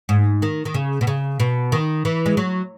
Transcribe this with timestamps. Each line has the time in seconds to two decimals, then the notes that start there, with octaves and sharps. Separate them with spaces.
0.09 G#2
0.42 D#3
0.65 D#3
0.74 C#3
1.01 B2
1.07 C#3
1.40 B2
1.72 D#3
2.05 E3
2.26 G#3
2.37 F#3